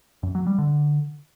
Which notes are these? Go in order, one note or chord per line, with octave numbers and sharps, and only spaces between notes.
F#2
F#3
G3
D3